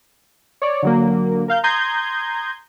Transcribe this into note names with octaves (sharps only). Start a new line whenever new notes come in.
C#5 D5
D3 F#3 A#3
A#4 F5 G6
A#5 C6 D#6 G6 G#6